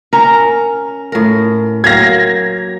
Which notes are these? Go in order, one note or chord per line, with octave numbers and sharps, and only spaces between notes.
C#4 A#4 A#5
A2 A#4
F#3 A#3 F5 G#6 A#6